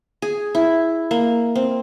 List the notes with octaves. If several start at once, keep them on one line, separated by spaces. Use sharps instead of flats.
G#4
E4
A#3
C4